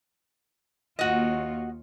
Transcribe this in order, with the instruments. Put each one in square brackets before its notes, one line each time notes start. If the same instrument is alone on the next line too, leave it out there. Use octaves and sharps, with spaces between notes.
[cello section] D#2 F4 C#5 [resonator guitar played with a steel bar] F#4 D#5